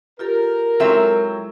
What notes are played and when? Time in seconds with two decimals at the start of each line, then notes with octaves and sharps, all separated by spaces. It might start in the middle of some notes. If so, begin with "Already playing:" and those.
0.19 F4 G4 A4 A#4
0.80 F#3 G#3 C4 E4 A4 E5